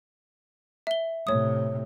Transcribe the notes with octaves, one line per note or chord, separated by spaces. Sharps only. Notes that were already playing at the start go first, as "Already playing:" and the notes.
E5 G7
A2 C3 C#5 D#6